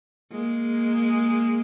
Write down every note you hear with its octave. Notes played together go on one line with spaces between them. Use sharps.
G#3 A#3